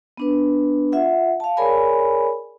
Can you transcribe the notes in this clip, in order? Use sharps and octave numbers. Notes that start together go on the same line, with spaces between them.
B3 D4 B4
F4 E5 F#5
F5 A5
G#4 A#4 C#5 D5 G#5 B5